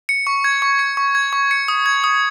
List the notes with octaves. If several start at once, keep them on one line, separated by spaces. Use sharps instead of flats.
C#7
C#6
G#6
C#6
C#7
C#6
G#6
C#6
C#7
D#6
G#6
D#6